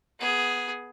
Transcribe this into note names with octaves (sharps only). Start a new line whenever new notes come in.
B3 G#4